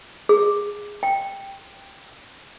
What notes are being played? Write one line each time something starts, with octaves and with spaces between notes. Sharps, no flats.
G#4
G5